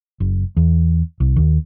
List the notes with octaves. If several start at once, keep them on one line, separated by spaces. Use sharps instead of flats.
F#1
E2
C2
D#2